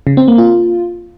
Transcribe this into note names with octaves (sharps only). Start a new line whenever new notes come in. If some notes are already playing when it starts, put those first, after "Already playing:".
C#3
C4
A#3
F4